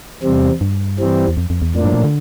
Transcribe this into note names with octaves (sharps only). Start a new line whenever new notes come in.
E2 C3 G3 C4
G2
E3 G3 C4
E2
F2
F2
E2
F2 A2 F3 A#3 D4
G2
A#2
D3